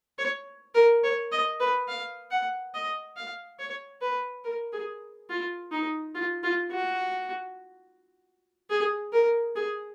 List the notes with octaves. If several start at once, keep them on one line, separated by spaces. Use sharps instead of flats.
C#5
A#4
C#5
D#5
B4
F5
F#5
D#5
F5
C#5
B4
A#4
G#4
F4
D#4
F4
F4
F#4
G#4
A#4
G#4